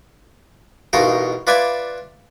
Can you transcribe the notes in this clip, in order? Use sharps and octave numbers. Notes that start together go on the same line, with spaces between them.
A1 B2 D#4 F4 A#4
F4 B4 D5 E5 G#5